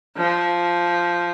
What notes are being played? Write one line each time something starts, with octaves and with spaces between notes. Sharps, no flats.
F3